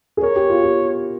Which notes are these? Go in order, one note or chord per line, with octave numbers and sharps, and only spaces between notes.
G#4
A#4 C#5
G4
F4
G4